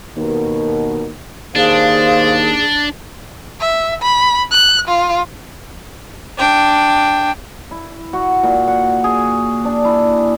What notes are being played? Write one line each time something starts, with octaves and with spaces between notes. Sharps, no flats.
D#2 B2 A#4
D#2 D4 G#4 C5 F5
E5
B5
F#6
F4
D4 G5
E4
F#4
A#2
F#5
G#4
D4
E4